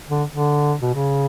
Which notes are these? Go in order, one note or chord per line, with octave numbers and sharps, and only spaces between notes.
D3
D3
B2
C#3